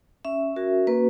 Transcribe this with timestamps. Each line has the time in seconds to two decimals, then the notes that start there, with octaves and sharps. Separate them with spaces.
0.25 C#4 E5
0.56 F#4 A#4
0.87 A#3 B4